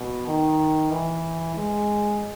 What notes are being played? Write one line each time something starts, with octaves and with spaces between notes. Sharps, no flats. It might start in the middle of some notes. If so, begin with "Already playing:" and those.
Already playing: B2
D#3
E3
G#3